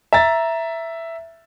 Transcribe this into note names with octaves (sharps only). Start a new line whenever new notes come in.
E5 A#5 A6